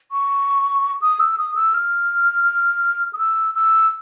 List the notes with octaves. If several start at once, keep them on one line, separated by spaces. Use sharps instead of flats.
C#6
D#6
E6
D#6
E6
F6
D#6
E6
E6